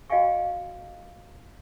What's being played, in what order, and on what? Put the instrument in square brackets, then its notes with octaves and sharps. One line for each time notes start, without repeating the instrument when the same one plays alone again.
[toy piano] F#4 D#5 F5 G5 G#5 C#6